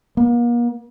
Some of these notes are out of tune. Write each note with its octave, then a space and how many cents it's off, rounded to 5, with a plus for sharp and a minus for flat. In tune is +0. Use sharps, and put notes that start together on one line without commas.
A#3 +40